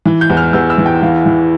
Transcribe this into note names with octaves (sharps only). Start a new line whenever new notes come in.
E3
G6
E2
F6
E2 E6
E6
E3
G5
E3 F5
E3